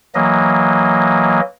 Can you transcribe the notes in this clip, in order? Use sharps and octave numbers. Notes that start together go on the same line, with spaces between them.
E3 F#3 A#3 D#5